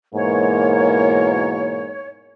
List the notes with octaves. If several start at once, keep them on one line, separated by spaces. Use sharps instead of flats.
G#2 B2 E3 A#3 C#5